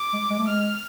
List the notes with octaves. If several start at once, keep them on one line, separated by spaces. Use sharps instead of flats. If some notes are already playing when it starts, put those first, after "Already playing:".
Already playing: D6
G#3
G#3
A3
G#3 F6